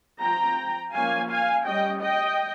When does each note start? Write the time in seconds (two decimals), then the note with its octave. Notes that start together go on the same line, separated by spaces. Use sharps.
0.21 F3 C4 G5 A#5
0.94 F3 A#3 C#4 F5 G#5
1.30 F5 G#5
1.66 G3 C#4 D#5 G5
2.02 D#5 G5